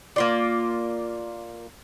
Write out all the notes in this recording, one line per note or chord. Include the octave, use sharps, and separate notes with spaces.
A#3 F4 D5